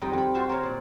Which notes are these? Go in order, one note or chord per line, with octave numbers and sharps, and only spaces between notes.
F2 G3 D#4 D#5 G5
F2 B5
F4 F#4 C5 E5 F5
A#4 C5 C#5 F5
A#2 D5